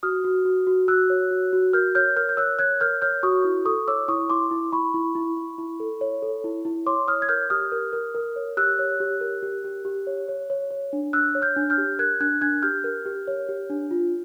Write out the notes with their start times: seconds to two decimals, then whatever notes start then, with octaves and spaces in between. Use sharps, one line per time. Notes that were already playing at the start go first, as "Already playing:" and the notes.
0.03 F#4 D#6 F6
0.24 F#4
0.45 F#4
0.67 F#4
0.88 F#4 E6 F#6
1.10 C#5
1.31 F#4
1.53 F#4
1.73 A#4 F6 G6
1.95 C#5 F6 G6
2.16 A#4 F6 G6
2.29 G6
2.37 C#5 E6 F#6
2.59 C#5 F#6 G#6
2.81 A#4 F6 G6
3.02 C#5 F6 G6
3.23 F#4 C#6 D#6
3.45 E4
3.65 A4 C#6 D#6
3.88 C#5 D6 E6
4.08 E4 C#6 D#6
4.29 E4 C6 D6
4.51 E4
4.72 E4 B5 C#6
4.94 E4
5.15 E4
5.37 E4
5.58 E4
5.80 A4
6.01 C#5
6.22 A4
6.44 E4
6.65 E4
6.86 C#5 C6 D6
7.08 C#5 D#6 F6
7.22 G#6
7.28 A#4 F6 G6
7.50 G4 D#6 F6
7.72 A#4
7.93 A#4
8.15 A#4
8.36 C#5
8.57 G4 E6 F#6
8.79 C#5
9.00 G4
9.21 A#4
9.42 G4
9.64 G4
9.85 G4
10.07 C#5
10.28 C#5
10.50 C#5
10.71 C#5
10.93 D4
11.13 D4 E6 F#6
11.35 C#5
11.42 F6 G6
11.56 D4
11.70 F6 G6
11.78 G4
11.99 A#4 F#6 G#6
12.20 D4 F#6 G#6
12.41 D4 F#6 G#6
12.63 G4 F6 G6
12.84 A#4
13.06 G4
13.28 C#5
13.49 G4
13.70 D4
13.91 F4